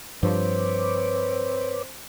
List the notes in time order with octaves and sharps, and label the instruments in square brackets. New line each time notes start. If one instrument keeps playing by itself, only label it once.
[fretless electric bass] G2 F3 [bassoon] C4 [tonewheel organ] B4 C#5 D6